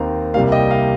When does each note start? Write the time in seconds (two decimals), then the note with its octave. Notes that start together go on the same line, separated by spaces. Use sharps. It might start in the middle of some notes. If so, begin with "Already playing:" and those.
Already playing: D#2 D#3 C4 F5 A#5
0.34 C2 C3 G3 A#3 F5
0.52 D#5 G5
0.71 F5